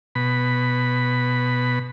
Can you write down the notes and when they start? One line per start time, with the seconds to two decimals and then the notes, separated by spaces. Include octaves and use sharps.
0.15 B2 B5